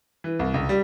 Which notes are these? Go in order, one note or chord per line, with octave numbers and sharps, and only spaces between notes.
E3
C2
C#2
G3